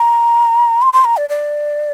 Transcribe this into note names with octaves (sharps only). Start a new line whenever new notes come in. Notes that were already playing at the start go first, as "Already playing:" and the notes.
Already playing: A#5
C6
C6
A#5
D5
D5